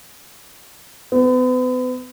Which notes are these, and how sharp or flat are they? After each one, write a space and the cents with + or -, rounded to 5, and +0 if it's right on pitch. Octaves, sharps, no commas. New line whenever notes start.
B3 +40